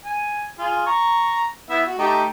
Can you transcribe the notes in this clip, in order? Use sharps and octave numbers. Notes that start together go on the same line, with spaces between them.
G#5
F4 G#4
A#5 C#6
B3 E4 E5
F#4
A3 D#4 G4